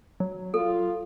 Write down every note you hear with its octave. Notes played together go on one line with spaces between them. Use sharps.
F#3
F4 A4